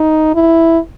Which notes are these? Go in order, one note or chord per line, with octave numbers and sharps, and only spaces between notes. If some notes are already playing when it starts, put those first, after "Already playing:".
Already playing: D#4
E4